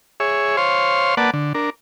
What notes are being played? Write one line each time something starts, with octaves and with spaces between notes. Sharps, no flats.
G#4 C#5 E5
C5 C#5 F5 C6
A#3 B4 D5 F#5 A5
D3
D4 A#4